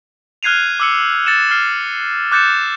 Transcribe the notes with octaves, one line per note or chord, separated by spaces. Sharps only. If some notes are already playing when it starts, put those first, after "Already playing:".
F6 F#6 G#6 C7 D#7 F7
D6 E6 C#7
A6 C#7 E7
F6 C7
D6 F#6 G6 A6 C#7 E7